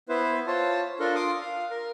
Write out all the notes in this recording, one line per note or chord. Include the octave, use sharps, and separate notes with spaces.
B3 E4 B4 C5
F4 C5 C#5 A5
D4 F4 A4 A#4
F4 C6 D6 D#6
F5
A#4